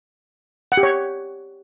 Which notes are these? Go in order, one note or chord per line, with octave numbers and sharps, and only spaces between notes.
F#5
G4
C#5